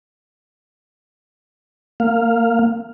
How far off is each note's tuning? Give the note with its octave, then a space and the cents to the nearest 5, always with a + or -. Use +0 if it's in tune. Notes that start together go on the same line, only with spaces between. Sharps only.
A#3 -20 F5 +0